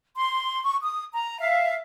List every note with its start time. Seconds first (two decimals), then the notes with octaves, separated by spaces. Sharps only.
0.16 C6
0.63 C#6
0.82 D#6
1.12 A#5
1.38 E5 F5